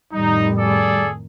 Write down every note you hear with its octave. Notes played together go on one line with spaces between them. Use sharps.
F2 A2 D#3 G3 D#4
G#4 A4 D5